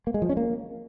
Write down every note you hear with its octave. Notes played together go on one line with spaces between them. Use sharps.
A#3
G#3
F3
C#4
A#3